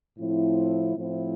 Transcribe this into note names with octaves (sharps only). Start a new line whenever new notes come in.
A2 F3 C4 E4
A2 F3 C4 E4